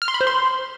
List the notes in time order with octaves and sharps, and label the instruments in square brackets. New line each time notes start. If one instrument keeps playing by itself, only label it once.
[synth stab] F6
C6
B5
C5
C6